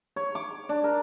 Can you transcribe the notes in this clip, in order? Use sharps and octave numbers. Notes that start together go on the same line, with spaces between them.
C#5
D6
D4
A#4